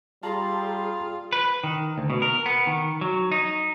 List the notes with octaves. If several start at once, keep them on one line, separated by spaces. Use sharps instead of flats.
G3 F4 G#4 A5 A#5 C6
B4
D#3
D2
B2
A#4
B3
D#3
F#3
D#4